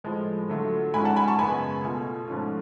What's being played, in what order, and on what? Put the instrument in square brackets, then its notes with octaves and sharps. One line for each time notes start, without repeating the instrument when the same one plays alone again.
[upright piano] A2 F3 G#3
D3 F#3 A3 F4
G#2 G#3 C#4 F4 G#5 B5
F#5 A5
G#5 B5
A5 C#6
F#2 C#3 G#3 B3 G#5 B5
B2 A3 F4
G#2 F3 A3 C#4 F4